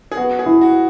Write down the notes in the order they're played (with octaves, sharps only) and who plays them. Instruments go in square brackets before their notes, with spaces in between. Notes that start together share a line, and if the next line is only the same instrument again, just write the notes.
[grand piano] G#4
[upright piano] B3 [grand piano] F#4
[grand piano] G#4
[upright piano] E4
[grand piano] F#4